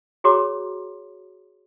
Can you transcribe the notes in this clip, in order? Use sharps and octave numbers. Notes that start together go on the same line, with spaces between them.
F#4 G#4 C#5 A#5 C6 D6